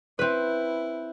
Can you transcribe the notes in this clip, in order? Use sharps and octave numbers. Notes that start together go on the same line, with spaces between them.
C4 E4 B4